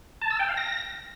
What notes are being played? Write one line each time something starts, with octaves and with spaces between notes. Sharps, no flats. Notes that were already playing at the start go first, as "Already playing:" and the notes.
A5
E6
G5
F5
A#6